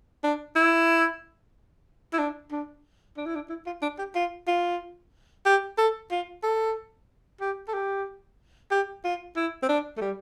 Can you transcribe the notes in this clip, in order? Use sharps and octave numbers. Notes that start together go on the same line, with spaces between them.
D4
E4
E4
D4
D4
D4
E4
D4
E4
F4
D4
G4
F4
F4
G4
A4
F4
A4
G4
A4
G4
G4
F4
E4
C4
D4
A3
G3